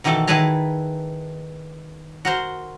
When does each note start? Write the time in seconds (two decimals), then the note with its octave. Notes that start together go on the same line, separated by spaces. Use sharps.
0.04 B2 D#3 E3 A3 A4
0.27 D#3 E4 G#4 B4 A5 A#5
2.25 F#4 A#4 C5